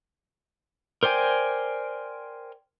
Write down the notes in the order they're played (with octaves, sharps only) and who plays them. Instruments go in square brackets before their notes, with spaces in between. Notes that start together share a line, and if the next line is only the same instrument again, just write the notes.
[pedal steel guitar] A#4 C5 D5 G5 G#5